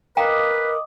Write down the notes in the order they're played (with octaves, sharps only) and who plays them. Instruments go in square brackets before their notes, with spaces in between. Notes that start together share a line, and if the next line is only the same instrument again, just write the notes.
[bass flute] A#4 [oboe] B4 [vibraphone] D#5 D6 D#6 [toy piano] F5 G5 A#5